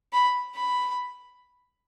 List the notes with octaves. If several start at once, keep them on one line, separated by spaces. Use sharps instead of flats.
B5
B5